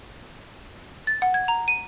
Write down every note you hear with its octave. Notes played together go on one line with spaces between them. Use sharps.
A6
F#5
G#6
A#5
D#7